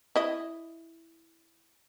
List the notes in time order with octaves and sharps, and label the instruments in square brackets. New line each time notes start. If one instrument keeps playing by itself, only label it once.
[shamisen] E4 D#5